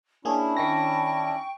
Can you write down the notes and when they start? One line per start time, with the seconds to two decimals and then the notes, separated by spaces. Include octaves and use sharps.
0.25 A#3 C#4 D4 E4 G#4 A5
0.57 D#3 D#4 G5 C#6 A#6